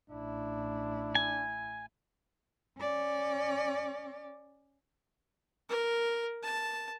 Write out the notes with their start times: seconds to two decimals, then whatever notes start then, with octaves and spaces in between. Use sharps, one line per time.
0.10 A1 D4 E4
1.15 G#5
2.78 C#4 D5
5.69 A#4
6.43 A5